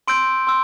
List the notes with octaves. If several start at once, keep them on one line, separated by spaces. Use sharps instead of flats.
C6 E6 G6 D7
C6 E6